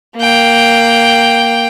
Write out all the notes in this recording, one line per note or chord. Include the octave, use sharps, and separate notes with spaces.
A#3 G5